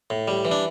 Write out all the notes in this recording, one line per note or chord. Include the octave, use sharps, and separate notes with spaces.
A2
G3
E3
D4